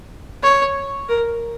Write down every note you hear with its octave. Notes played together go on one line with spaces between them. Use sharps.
C#5
A#4